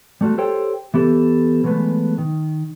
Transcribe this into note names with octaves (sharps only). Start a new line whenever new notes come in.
G3 A3 F4 F#4
G4 A4 C5 C#5 G5
E3 B3 G4 A4
E3 F#3 G#3 A3 B3 B4
D#3